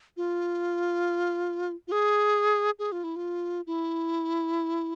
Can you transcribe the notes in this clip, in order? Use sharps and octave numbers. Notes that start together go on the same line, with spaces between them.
F4
F4
G#4
G#4
F4
E4
F4
E4